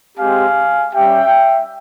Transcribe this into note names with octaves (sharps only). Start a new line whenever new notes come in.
G#3 C4 G4 F5 G#5
G3 C#4 G4 E5 G5